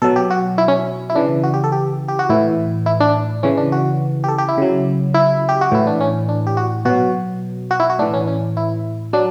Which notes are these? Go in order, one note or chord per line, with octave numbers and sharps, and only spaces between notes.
B2 F#3 A4
G4
F#4
E4
C#4
E4
C#3 E3 D4
F#4
G4
A4
G4
G4
F#4
A2 E3 E4
E4
D4
C#3 E3 C#4
D4
F#4
G4
A4
G4
E4
C#3 F#3
E4
G4
F#4
A2 E3 E4
D4
C#4
D4
G4
F#4
B2 F#3 F#4
F#4
E4
F#4
A2 E3 D4
C#4
C#4
E4
F#3 D4